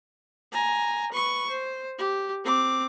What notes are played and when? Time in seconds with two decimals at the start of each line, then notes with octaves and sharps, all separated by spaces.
0.52 G#5 A#5
1.12 B4 C#6
1.49 C5
1.98 G4
2.45 C4 D6